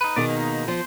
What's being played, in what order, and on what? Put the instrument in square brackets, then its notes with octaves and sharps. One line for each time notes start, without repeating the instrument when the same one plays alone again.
[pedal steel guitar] D#4 B4
[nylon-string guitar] B2 D#3 G#4 [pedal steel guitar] D5
[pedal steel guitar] A#3 D#4
[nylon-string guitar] F3 [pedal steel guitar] C5